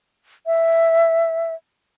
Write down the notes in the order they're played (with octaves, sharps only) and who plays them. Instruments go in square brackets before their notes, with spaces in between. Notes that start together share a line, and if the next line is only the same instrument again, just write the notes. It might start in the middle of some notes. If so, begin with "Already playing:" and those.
[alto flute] E5